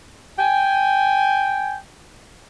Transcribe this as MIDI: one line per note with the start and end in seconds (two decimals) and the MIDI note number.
0.38 1.77 79
0.38 1.77 80